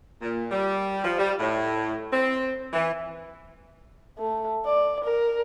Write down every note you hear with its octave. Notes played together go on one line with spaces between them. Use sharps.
A#2
G3
F3
G3
A2
C4
E3
A3
D5
A#4